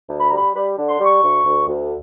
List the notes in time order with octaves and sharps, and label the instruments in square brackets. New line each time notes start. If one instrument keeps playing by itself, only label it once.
[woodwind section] D2
B5
G3 A#5
B5
G3 B5
D3
C6
G3 C#6
D2
D2
D2